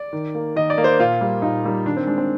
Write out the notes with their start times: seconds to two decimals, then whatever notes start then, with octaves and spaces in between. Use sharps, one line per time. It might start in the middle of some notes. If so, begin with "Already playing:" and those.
Already playing: D5
0.13 D#3
0.35 A#3
0.56 D#3 D#5
0.70 D5
0.78 A#3
0.84 C5
0.99 A#2 F4
1.21 G3 A#3
1.42 A#2 D#4
1.65 G3 A#3
1.86 D#3 D4
1.97 C4
2.07 G#3 D4
2.18 C4